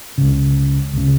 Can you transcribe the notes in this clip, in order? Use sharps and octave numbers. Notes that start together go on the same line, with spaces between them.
C#2 C#3
C#2 C#3